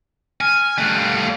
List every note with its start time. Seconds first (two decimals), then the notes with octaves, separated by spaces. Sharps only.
0.41 G#5 F6
0.78 G3 A3 F#6
0.96 F5